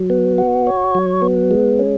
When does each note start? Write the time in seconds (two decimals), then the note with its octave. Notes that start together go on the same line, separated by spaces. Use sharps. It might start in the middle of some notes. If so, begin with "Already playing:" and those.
Already playing: F#3
0.10 B3
0.38 F#4
0.67 C#5
0.95 F#3
1.22 B3
1.51 G#3
1.79 C#4